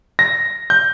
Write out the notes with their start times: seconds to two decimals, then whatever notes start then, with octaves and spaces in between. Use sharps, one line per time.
0.19 A#6
0.70 G6